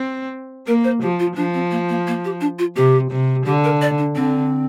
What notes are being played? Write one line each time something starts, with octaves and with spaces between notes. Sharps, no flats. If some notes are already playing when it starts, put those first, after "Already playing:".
Already playing: C4
A#3 A#4
C5
F3 G4
F4
F3 D4
C4
A#3
A#3
A#3
G4
D4
F4
C3 G4
C3
D3 G4
A#4
D5
D4
D3 C4